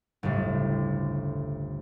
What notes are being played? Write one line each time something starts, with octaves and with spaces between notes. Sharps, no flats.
G1 D2 A2 C#3 G3